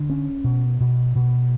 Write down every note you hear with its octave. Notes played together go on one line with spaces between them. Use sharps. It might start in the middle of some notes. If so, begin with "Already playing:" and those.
Already playing: D3
C#4
B2
B2
B2